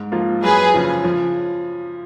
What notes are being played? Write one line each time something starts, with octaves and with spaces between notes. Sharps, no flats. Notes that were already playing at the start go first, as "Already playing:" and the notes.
Already playing: G#2
F3 A#3 F4
F#2 G#4 B4
C#3 F3
F3